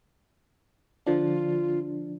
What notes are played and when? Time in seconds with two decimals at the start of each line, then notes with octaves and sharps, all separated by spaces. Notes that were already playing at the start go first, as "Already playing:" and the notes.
1.06 D3 F3 D4 F4